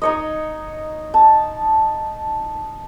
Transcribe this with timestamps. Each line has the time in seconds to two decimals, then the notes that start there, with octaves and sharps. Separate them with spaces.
0.02 D#4 C#5 D#5
1.14 A5